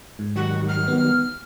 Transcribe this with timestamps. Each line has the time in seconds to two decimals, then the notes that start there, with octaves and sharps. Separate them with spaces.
0.19 G#2
0.36 D#3 F#3 G3 F#4
0.68 F6
0.88 B3